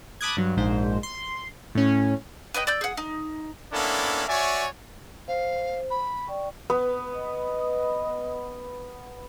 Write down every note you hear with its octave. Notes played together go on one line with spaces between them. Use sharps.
A5 B5 D6 D#6 F#6 G#6
G2 F#3
A#1 G#2 C5
C6
A2 C#4
B4 C#5 D#5 G5
D5 E6 G6
G#4 F#5
D#4
A#3 B3 C#4 D4 E4 A4
F#4 C#5 D5 E5 G#5
C5 F5
B5
D5 G5 C#6
B3
D#5